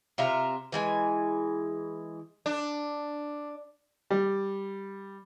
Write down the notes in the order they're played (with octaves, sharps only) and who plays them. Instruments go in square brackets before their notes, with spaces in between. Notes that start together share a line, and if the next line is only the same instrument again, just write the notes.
[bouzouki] C3 F4 E5 A#5
E3 G#3 G#5
[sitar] D4
[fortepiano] G3